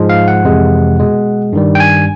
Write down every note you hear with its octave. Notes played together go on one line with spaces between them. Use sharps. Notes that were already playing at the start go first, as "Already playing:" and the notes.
Already playing: G#2 F3 G#3
F5
F#5
F2 C3 E3 G#3
B2 G#3
G2 D#3 G3
G5
G#5